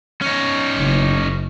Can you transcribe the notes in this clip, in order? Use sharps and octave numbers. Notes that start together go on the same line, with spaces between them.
C#4 D#4
F#1